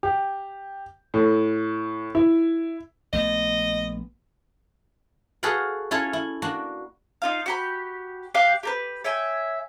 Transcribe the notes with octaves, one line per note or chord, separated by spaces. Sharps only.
G4
A2
E4
A#1 A3 B3 D#5
F#4 G#4 A4 B4 F5 F#5
C#4 E4 F4 A4 C#5
E4
A#3 D4 F#4
D#4 F4 F5
F#4 G4 B5
G4 F5 G5 F#6
G4 A#4 B4
C#5 E5 G5 G#5